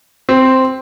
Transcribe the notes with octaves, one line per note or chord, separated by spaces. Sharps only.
C4